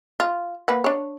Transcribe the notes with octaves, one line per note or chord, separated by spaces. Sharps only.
F4
A#3 B4 F#5
D4 C#5